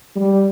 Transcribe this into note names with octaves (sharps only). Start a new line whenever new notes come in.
G3